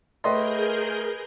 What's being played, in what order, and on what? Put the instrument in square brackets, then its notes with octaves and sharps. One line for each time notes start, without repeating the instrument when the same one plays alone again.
[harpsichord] A2 [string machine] G#4 A#4 G6 [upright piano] B4 D#5 C6